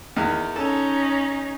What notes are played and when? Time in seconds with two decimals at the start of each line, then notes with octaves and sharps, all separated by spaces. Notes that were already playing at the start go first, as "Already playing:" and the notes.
0.16 E2 D#3
0.56 C#4 D#4 A4 A5